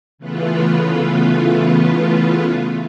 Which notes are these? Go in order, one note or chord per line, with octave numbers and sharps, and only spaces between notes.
C#3 E3 A3 B3 F4 B4